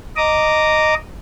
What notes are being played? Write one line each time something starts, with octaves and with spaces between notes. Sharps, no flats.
D#5 A#5 D6 D#6